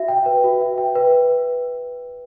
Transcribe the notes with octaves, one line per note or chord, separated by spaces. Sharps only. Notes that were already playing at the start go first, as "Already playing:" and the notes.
Already playing: F#4 E5
G5
B4
F#4
E5
G5
B4